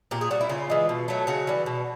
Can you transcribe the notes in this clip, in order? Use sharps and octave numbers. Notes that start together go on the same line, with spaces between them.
A#2 G4
G#4
G3 F#4
E4
C#3 F4
E3 G#3
B2
F#3 A3
C#3 F#4
E3 G3
B2